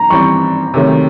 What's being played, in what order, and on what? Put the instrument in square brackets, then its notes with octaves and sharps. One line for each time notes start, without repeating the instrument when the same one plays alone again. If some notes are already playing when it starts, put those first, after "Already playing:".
Already playing: [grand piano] A#5
[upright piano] E3 G3 C4 [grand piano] C#6
[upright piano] C3 D#3 F#3 A3